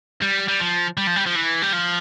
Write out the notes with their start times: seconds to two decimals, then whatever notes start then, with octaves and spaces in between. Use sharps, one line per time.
0.22 G3
0.48 G3
0.60 F3
0.97 G3
1.07 F3
1.16 G3
1.26 F3
1.35 E3
1.62 G3
1.73 F3